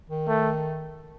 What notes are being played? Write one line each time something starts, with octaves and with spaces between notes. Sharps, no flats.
D#3
A3